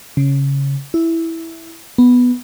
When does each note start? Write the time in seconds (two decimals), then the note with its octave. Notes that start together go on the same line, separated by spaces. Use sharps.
0.17 C#3
0.94 E4
1.98 B3